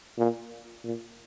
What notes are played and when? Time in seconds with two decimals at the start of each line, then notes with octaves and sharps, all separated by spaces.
0.18 A#2
0.84 A#2